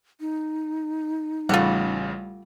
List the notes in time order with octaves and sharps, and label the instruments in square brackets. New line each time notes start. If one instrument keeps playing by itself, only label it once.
[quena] D#4
[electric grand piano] A1 C#3 [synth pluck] G3 A3 [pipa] F4 F#5